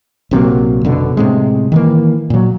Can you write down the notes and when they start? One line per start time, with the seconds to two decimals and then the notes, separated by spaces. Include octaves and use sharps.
0.31 A#1 C3 F#3 A#3
0.85 F1 B2 D3
1.17 A2 C3 G#3
1.72 D#3 E3 A#3
2.30 A#2 F#3